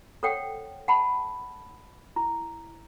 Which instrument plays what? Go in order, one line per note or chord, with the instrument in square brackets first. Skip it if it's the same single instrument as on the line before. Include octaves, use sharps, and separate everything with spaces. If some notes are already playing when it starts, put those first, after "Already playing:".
[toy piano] A4 C5 C#5 F#5 G5
F#5 A5 B5
E4